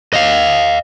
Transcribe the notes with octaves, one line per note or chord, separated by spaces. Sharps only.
D#5 F5